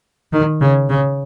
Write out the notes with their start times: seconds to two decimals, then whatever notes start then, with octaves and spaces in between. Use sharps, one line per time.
0.33 D#3
0.61 C#3
0.89 C#3